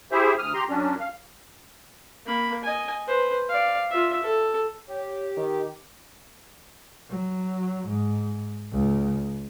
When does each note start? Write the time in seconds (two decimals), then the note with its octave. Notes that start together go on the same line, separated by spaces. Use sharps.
0.12 E4 G4 G#4 C5 E5
0.38 D2 D#6 F6
0.54 G4 A#5 C6
0.69 F#2 F#3 C#4 D4
1.00 F5
2.26 A#3 B5
2.63 D#5 G#5
3.07 B4 C5
3.49 D5 F5
3.91 F4 E5
4.23 A4
4.89 G4 C#5
5.37 D#3
7.10 F#3
7.88 G#2
8.72 C#2